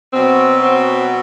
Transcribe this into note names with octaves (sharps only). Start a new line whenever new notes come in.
B2 F#3 C4
C4